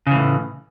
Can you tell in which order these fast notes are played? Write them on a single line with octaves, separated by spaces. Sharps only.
C#3 E3 A2